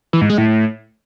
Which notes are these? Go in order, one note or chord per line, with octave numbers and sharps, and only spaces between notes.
E3
G#2
G#3
A2